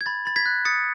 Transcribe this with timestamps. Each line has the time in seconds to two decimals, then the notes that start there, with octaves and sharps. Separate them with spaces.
0.01 G#6
0.06 B5 A6
0.25 B5 A6
0.36 G#6 B6
0.46 F#6
0.65 D#6 A6 C#7